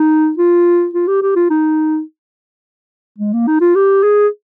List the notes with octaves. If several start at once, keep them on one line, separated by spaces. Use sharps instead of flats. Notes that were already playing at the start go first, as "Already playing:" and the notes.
Already playing: D#4
F4
F4
G4
G4
F4
D#4
G#3
A#3
D#4
F4
G4
G#4